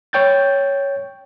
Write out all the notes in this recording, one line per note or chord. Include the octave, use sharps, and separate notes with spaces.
C#5 G5 G6 A6